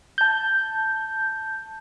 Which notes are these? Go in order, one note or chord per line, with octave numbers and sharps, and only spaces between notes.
A5 G6